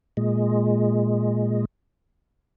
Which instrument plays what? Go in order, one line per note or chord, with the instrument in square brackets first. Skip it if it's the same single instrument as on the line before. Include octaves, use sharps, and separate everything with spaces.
[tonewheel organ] A#2 G#3